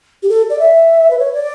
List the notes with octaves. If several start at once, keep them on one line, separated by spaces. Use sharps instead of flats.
G4
A4
D5
E5
B4
C#5
D5